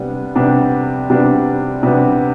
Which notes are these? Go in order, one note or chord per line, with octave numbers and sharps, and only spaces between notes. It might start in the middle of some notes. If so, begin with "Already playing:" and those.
Already playing: C3 G3 B3 D4
C3 G3 B3 D4
C3 G3 B3 D4
C3 G3 B3 D4